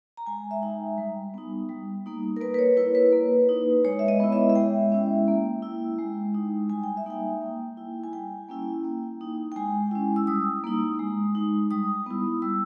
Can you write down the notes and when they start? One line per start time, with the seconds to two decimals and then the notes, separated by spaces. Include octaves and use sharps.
0.17 A#5
0.26 G#3 G#5
0.51 E5
0.62 D#4 G5
0.98 G3
1.34 B3 D#4
1.69 G3
2.06 A#3 D#4
2.36 A#4
2.41 A#3 B4
2.54 B4
2.59 C#5
2.77 E4 B4
2.95 B4
3.13 A#3
3.49 D#4
3.84 G#3 C#5
3.99 E5
4.08 D#5
4.20 B3 E4
4.32 E5
4.50 E5
4.55 G#3 G5
4.92 C#4 E4
5.28 A#3
5.62 E4
5.99 G#3
6.35 D#4
6.70 G3 G#5
6.84 G5
6.97 E5
7.06 A#3 D#4 G5
7.41 A#3
7.77 E4
8.04 G#5
8.13 G3 G5
8.49 A#3 C#4 E4
8.84 A#3
9.21 D#4
9.52 G5
9.56 G#3 G#5
9.91 C#4 E4
10.16 E6
10.27 G3 D#6
10.64 A#3 D#4
10.99 G#3
11.35 D#4
11.71 G3 D#6
12.06 B3 E4
12.42 G3 E6